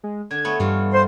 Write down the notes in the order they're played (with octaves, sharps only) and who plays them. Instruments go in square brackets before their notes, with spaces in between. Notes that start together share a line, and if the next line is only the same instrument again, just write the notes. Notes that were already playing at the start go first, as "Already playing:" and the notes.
[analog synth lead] G#3
[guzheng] D3 [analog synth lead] G#6
[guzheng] A3 B3 C#5
[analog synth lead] G2 [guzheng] E3 A3 F4
[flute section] C5 C6